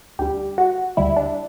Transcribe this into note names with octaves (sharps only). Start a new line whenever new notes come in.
D2 D3 G3 G4
F#4
D2 D3 G3 E4
D4